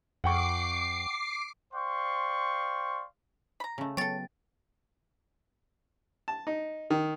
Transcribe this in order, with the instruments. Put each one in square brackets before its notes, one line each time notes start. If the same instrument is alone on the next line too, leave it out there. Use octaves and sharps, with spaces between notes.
[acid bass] F2 [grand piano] F#5 G5 C#6 [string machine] D6 C7
[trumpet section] C5 D5 F5 G5 C6 C#6
[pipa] A#5 B5
[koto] C#3 A3
[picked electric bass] F#3 B3 [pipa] A4 C#5 [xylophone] G5 A6
[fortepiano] A5
D#4
D#3